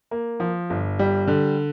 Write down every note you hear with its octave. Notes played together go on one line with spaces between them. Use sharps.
A#3
F3
G1
G3
D3